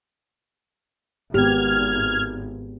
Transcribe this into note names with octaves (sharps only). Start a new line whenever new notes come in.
G#1 B3 G4 F6 G#6